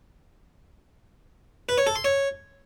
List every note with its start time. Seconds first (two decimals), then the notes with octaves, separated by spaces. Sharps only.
1.69 B4
1.78 C#5
1.87 A4
1.96 C6
2.04 C#5